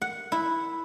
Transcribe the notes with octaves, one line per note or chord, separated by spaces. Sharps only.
F#5
E4